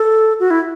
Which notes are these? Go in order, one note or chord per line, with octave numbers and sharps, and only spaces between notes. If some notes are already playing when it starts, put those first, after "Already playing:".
Already playing: A4
F#4
E4